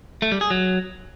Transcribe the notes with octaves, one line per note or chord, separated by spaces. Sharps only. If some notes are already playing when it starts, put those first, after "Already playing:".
A3
G3
G#4
F#3